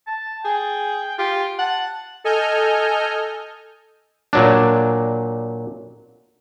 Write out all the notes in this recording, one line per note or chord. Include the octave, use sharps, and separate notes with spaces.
A5
G#4 G5
F4 G4
F#5 A5
A4 D#5 G#5 F6 G6
A#2 F#3 D4